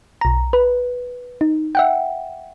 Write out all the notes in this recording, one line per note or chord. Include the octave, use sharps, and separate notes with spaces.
B1 A#5
B4
D#4
E5 F#5 G5